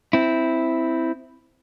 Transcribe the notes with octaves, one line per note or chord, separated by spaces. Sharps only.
C4 E4